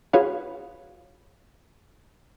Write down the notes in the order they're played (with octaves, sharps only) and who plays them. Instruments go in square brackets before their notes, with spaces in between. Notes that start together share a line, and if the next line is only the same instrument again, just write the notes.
[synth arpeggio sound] F4 F#4 G#4 B4 C#5 F5